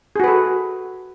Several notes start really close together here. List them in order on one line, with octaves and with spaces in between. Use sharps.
G#4 F#4 B4 A4